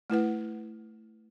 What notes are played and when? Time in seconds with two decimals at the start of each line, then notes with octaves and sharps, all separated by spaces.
0.10 A3 E4 B4 F#5